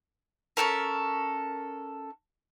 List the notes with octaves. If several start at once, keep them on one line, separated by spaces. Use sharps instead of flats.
C#4 D4 A4 A#4